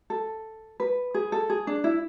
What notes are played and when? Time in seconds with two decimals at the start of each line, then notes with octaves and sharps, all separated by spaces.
0.10 A4
0.80 B4
1.14 G#4
1.32 A4
1.50 G#4
1.67 D4
1.84 E4